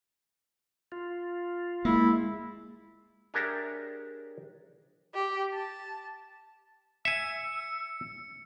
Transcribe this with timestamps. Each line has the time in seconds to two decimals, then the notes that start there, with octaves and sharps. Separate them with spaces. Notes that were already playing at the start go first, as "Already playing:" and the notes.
0.92 F4
1.85 G#3 A#3 E4
3.34 D4 G4 G#4 A#4 C#5 E5
5.14 G4
5.54 A5
7.05 E5 G#5 E6 C#7